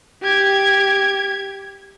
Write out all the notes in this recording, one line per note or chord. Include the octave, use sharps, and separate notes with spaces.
G4 G#6